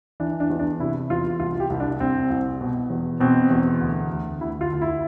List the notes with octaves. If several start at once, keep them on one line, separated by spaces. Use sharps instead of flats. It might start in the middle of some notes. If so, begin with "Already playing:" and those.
E3 D4
D4
E2
D4
C3 E4
E2 F4
C2 F4
G4
C2
D4
C2 C4
C2
B2
E2
B2 C4
E2
D2
D2
D2 E4
F4
D2
E4